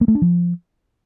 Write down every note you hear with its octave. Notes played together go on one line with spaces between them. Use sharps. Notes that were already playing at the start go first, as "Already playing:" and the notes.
A#3
A3
D4
F3